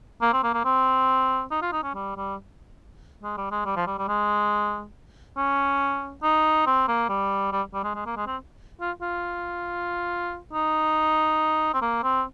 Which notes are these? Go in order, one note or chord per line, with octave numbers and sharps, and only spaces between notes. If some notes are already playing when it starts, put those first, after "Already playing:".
A#3
C4
A#3
A#3
C4
D#4
F4
D#4
C#4
G3
G3
G#3
G3
G#3
G3
F3
G3
G3
G#3
C#4
D#4
C4
A#3
G3
G3
G3
G#3
G#3
A#3
G#3
C4
F4
F4
D#4
C4
A#3
C4